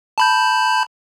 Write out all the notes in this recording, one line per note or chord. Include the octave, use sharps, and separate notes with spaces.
A5 B5 G6